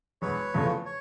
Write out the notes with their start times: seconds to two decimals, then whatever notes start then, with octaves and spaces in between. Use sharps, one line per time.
0.22 E1 B4 C#5
0.54 E2 C#3 F3 A3
0.85 C#5